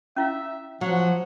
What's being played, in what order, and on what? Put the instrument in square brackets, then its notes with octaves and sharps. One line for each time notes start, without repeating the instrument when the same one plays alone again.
[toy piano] C#4 E4 F5 [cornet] E5
[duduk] F3 [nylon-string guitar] F#3 [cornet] F#5